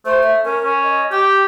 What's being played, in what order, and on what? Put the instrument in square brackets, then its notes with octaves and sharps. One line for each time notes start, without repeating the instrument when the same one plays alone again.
[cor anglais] A3 [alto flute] C5
[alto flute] E5
[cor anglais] C#4 [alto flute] A#4
[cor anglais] C#4
[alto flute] D#5
[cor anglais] G4 [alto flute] G5